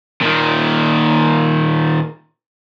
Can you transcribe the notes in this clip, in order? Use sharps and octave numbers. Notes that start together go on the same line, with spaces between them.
A#2 D#3